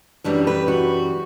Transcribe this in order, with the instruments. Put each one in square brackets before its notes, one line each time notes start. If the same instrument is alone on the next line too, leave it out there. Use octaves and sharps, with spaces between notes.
[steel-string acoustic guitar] F#2 E3 G3 D4
B4
F#4